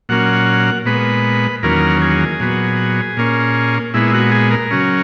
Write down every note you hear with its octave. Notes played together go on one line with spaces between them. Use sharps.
A#2 F#3 A#3 C#4 F#5
A#2 G#3 B3 B4
E2 D#3 F#3 A#3 C#4 A#4
G#4
A#2 F#3 B3
A#2 A#3 C#4
A#2 G#3 B3 E4
F#4
G#4
A#4
C#3 F#3 C#4